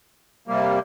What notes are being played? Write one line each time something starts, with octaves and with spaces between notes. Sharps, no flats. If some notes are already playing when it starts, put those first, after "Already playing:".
C3 G3 A#3